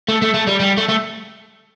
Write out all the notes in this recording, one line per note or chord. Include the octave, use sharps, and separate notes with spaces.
A3
A3
A3
G3
G3
A3
A3